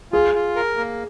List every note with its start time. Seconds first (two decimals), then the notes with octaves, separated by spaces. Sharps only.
0.12 F4 G#4
0.35 F4
0.56 A#4
0.77 A#3